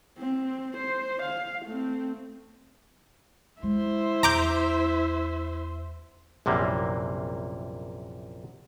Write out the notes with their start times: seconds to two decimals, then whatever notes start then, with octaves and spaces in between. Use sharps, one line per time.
0.18 C4
0.77 C5
1.23 F5
1.66 A3 C4
3.63 G#3 E4 C5 E5
4.23 E2 A#5 D6 G6
6.46 A#1 F#2 C3 E3 G3 A#3